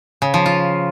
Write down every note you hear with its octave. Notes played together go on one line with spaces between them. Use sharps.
C#3
F3
F4